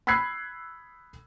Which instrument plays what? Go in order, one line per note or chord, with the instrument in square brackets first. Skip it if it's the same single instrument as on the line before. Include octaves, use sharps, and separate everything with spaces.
[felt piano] B5 E6 F#6 G#6 C7